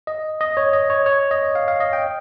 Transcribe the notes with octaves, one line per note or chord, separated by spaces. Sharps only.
D#5
D#5
C#5
D#5
C#5
C#5
D#5
F5
F5
D#5
G5